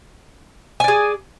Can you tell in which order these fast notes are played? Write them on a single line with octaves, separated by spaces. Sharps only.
G#5 D5 G#4